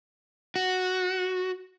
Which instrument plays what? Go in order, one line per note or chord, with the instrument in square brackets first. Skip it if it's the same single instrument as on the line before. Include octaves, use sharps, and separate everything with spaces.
[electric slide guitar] F#4